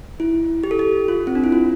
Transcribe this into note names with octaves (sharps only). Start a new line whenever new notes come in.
E4
G4
A4
G4
F4
C4
D4
E4
F4